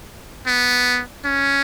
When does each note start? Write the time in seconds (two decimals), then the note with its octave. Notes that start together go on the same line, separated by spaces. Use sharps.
0.47 B3
1.26 C#4